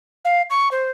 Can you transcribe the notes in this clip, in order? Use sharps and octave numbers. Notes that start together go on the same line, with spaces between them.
F5
C#6
C5